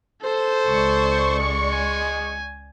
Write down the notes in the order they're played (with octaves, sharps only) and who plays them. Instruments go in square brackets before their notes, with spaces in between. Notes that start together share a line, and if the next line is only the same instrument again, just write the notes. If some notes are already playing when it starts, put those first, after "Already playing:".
[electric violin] A4 [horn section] C5
[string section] C#2 D5 C#6
[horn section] G#3
[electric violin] G#5